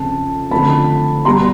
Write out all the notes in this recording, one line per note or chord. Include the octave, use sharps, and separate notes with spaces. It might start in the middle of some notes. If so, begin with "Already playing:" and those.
Already playing: F2 C#3 F3 A5
D3 F3 A3 C4 A5 B5
B2 G3 B3 A#5 C6